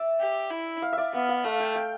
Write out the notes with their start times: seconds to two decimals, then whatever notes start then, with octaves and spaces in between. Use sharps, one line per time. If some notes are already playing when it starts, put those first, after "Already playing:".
Already playing: D5 E5
0.20 G4
0.50 E4
0.82 F5
0.93 D5 E5
1.13 B3 F5
1.29 F5
1.44 A3 F5
1.60 G5
1.76 G5